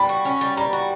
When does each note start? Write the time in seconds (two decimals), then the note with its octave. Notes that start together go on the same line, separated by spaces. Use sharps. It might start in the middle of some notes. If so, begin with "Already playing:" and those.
Already playing: G3 B5
0.09 F#4
0.25 C#4
0.41 G3
0.57 G3 A#5
0.73 F#4